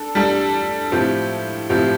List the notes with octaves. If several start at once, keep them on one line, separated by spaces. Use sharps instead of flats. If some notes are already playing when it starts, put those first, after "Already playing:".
Already playing: D4 A4
G3 D4 A4
A2 F3 C4 G4
A2 F3 C4 G4